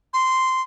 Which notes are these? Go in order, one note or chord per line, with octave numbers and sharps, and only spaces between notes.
C6